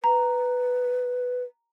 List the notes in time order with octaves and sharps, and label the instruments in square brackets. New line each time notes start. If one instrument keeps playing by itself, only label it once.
[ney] B4 [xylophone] A#5